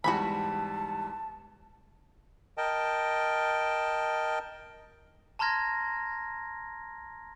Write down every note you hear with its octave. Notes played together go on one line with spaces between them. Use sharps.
E2 G#2 G3 F#4 G#5 A5 B5
A#4 D#5 G5 A5
A5 A#5 C6 F6 G#6 A#6